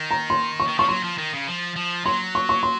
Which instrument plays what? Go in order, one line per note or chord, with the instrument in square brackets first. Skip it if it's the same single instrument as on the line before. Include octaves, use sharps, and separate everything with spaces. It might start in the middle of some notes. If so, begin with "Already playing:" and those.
Already playing: [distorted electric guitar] D#3
[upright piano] A#5
C6
C#6
[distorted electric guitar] D#3
[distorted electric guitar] F3 [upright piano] C#6
[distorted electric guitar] F#3 [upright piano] C6
[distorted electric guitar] F3
D#3
C#3
F3
F3
[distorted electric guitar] F#3 [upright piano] C6
[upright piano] C#6
C#6
C6